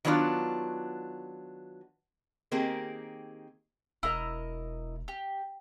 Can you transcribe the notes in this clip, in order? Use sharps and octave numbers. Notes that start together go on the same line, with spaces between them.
D#3 F#3 B3 D4 F4
D#3 A#3 C4 G4 G#4 A#4
E1 E4 A#4 D#5
G4